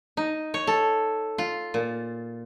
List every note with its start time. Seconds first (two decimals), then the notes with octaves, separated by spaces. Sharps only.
0.17 D#4
0.54 C#5
0.67 A4
1.38 F4
1.74 A#2